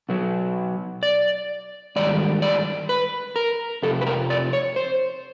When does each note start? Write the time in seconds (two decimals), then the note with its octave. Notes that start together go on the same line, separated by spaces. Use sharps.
0.09 B2 F#3
1.03 D5
1.96 G#2 D#3 G3 D5
2.42 D5
2.89 B4
3.36 A#4
3.82 F2 C3 A4
4.01 B4
4.07 A#4
4.30 D5
4.53 C#5
4.76 C5